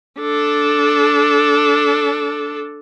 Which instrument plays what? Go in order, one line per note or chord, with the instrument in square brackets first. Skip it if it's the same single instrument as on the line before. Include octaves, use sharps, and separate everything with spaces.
[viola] D4 A4